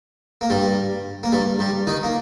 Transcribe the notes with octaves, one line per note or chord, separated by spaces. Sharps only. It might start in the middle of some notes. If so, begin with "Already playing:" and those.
A#3
G2 G3
A#3
G2 G3
G2 G3
D#3 D#4
A#3